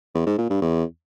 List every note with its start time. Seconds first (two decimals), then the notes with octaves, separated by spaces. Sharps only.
0.15 E2
0.26 G#2
0.38 A#2
0.50 G2
0.62 E2